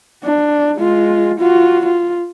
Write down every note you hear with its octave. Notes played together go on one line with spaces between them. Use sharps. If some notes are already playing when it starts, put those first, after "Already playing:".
D4
G#3 F4
F4 F#4
F4